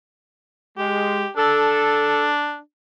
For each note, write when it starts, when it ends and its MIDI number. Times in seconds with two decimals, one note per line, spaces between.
0.77 1.23 56
0.77 1.30 67
1.37 2.59 62
1.37 2.28 69